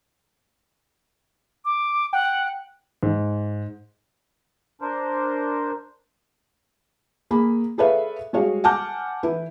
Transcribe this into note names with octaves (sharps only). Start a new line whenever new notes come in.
D6
F#5 G5
G#2
D4 A#4 C5
A#3 G#4 B5
G#4 A4 B4 C#5 E5 F5
G3 G#3 F#4 G#4 C#5 F5
F#5 G#5 A5 D6 F6 G6
E3 E4 B4